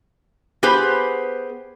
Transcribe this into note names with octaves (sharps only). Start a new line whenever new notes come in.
B3 G4 G#4 B4 C5